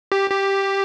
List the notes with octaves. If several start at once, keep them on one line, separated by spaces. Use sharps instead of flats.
G4
G4